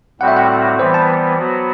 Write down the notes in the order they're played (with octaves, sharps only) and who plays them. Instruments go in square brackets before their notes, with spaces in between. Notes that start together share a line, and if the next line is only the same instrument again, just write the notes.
[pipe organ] A2 G3 C4 F#4 [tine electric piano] F#5
[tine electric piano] E5
F#5
[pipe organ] E3 G3 B3 [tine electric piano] C5
[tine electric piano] A5
[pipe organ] F#3 B3 F#4